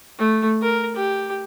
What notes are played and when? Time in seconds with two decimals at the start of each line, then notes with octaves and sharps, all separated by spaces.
0.18 A3
0.61 A#4
0.96 G4